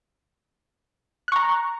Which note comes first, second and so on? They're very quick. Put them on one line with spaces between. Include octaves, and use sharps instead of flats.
F#6 C#6 A#5